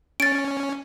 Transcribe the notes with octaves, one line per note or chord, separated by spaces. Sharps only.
C#4 A6 D7